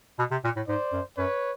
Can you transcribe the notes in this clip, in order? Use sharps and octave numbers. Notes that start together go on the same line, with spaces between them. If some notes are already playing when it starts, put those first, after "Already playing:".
B2
C3
A#2
A2
G#2 C5 D5
F#2
F#2 B4 C#5